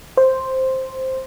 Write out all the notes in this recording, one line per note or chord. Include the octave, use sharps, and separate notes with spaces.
C5